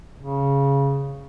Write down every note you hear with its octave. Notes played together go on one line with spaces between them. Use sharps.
C#3